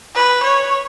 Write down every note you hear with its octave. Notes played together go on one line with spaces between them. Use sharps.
B4
C#5